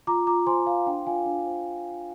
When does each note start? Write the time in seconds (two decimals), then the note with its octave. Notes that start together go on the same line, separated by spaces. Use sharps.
0.07 F4 A#5 D6
0.27 F4 A#5 D6
0.47 C5 G#5 C6
0.67 C5 F5
0.87 D4 G5
1.07 F4 F5 G#5
1.26 D4
1.46 C5